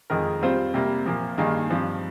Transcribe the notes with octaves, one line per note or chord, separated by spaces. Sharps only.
F2 D#3 G#3 D#4 A#4
G3 C4 F4 C5
C3 G3 A#3
A#2 F3 A#3
G2 D#3 A#3 D#4 G#4
G2 F3 C4